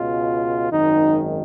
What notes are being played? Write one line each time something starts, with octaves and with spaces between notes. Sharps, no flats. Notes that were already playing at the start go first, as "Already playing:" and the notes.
Already playing: C#2 B2 G#3 F4
G#1 F#2 D#3 G#3 D#4